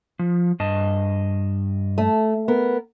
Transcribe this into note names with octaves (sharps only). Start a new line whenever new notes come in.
F3
G2 D#5 A5
A3
B3 A#4